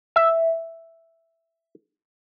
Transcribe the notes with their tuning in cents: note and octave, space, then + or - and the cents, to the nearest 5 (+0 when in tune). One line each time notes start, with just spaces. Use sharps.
E5 +0